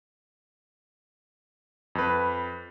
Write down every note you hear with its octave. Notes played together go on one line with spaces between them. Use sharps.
F2 B4